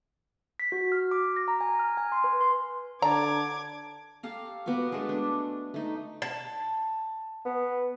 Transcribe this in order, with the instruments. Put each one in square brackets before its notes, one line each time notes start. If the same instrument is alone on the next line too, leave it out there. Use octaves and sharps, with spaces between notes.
[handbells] B6
F#4
F6
D6
A#6
A#5
G#5
F6
G#5
C6
B4
C6
[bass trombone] D3 [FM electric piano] D5 A5 [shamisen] A#5 [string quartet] D6 G#6
[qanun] G4 A4 F5 A#5
B3 F#4 A#4 D6
G#3 A3 D4 A4
D4
A3 D#4
[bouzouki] A5
[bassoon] B3